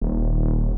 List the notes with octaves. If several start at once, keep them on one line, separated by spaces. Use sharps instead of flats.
D#1